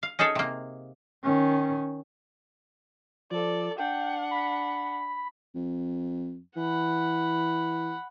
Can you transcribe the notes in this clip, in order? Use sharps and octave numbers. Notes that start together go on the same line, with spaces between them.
F5
C#4 D#4 G#4 A4 C#5
C3 A#3
D#3 C#4
F3 A4 D5
D4 F#5 G5
B5
F2
E3 F#5 B5